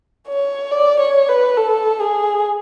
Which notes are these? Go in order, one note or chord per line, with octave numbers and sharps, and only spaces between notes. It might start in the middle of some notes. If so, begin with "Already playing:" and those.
C#5
D5
C#5
B4
A4
G#4